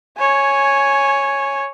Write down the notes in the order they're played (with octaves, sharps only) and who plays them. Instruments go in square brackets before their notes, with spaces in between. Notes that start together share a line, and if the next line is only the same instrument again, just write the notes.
[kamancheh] C#5 G#5